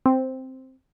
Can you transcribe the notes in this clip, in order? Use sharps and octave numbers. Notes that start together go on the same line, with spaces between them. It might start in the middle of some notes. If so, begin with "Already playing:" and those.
C4